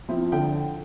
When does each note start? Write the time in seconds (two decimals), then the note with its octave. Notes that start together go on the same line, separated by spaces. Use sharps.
0.09 F3 C4 E4
0.32 D3 G5